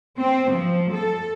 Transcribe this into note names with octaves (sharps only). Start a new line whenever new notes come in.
C4
F3
A4